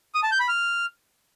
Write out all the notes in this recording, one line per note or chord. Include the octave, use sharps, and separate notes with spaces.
D#6
A5
G6
B5
F6